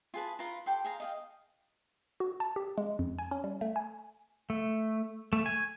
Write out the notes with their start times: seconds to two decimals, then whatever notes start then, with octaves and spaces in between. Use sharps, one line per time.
0.14 F4 G#4 B4 A5
0.39 F4 A#4 B4 A#5
0.66 G4 A4 G5 C6
0.84 G#4 F5 A#5
1.00 D#5 F5 G5
2.20 F#4
2.40 A5
2.56 G4
2.78 G#3
2.99 F2
3.19 G#5
3.31 C#4
3.44 G3
3.61 A3
3.76 G#5
4.50 A3
5.33 A3
5.46 G#5